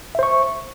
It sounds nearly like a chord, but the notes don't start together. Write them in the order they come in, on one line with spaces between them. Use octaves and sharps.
E5 C5 C#6